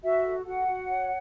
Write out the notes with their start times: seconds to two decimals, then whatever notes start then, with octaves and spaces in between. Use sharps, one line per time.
0.03 F#4 E5
0.24 A4
0.45 F#4 F#5
0.65 F#4
0.87 C#5